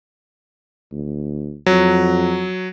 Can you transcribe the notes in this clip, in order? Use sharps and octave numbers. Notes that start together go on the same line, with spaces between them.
D2
F2 F#3